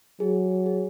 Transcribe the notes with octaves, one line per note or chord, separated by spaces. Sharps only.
F#3 G#4
G#4